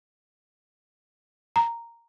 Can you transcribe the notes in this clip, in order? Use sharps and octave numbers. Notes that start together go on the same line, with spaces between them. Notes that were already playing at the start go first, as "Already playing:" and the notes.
A#5